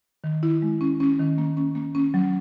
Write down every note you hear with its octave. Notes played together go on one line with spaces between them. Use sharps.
D#3
E4
G#3
C#4
C#4
D#3
A#3
C#4
A#3
C#4
F#3